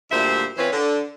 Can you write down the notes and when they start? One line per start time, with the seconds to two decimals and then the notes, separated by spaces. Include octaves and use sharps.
0.11 D2 A#2 G3 C5 E5
0.57 E3 C4 C#4 F4 B4 C5
0.73 D3